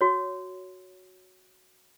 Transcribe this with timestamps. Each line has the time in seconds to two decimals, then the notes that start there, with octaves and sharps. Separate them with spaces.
0.01 F#4 C#5